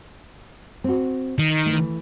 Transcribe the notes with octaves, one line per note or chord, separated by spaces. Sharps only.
C4 F#4
D#3
E3 A3